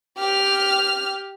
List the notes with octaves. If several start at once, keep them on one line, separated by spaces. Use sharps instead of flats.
G4 F6